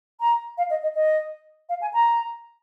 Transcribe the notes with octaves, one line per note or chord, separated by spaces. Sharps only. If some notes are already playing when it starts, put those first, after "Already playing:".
A#5
F5
D#5
D#5
D#5
F5
G#5
A#5